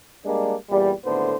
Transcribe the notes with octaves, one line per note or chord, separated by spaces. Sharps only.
G3 G#3 A#3 D4
E2 A#2 G3
G#1 A2 D3 B3 C5